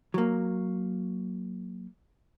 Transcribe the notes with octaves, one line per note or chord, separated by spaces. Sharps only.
F#3 A#3